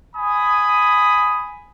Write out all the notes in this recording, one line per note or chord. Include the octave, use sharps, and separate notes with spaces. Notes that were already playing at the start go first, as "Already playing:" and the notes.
G#5 B5 D#6